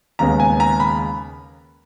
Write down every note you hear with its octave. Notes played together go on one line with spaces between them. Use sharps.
D#2 C#3 G#3 B3 A#5
G#5
A#5
B5